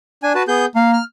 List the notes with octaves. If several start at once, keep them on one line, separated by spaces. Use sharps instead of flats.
D4 G#5
F#4 B4 A5
B3 G#4 G6
A#3 F5
F6